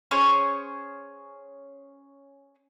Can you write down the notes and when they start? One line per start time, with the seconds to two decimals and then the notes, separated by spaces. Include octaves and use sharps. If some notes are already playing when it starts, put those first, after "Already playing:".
0.11 C#4 G#4 C5 C#5